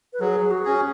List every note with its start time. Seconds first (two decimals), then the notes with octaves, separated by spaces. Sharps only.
0.13 B4
0.20 F#3 G#4
0.51 F#4
0.65 C#4 G#4